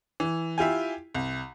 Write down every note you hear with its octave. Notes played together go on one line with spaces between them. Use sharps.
E3
E4 F4 G4 G#5
C2